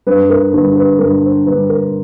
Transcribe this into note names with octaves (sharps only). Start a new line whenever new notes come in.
G2 B4
A#4
D3 G3 B4
B4
G2 A#4
C5
D3 G3 B4
A#4